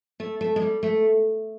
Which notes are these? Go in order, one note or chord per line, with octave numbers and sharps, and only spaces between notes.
A3
A3
G#3
G3
A3